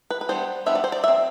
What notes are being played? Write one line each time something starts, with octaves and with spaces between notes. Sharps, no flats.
B4
B4
E3 G3 B3 D4 C5
E3 G3 B3 D4 E5
D5
C5
D5
F#3 C4 E5